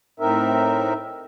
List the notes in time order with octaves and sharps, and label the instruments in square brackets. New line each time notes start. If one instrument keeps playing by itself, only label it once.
[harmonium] A2 C4 D#4 A#4 E5